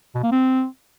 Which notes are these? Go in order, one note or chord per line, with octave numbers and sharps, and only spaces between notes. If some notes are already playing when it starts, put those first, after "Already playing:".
B2
A#3
C4